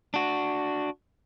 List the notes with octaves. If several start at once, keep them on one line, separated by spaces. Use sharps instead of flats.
D4 F#4